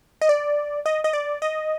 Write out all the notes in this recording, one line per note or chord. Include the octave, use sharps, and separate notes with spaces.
D#5
D5
D#5
D#5
D5
D#5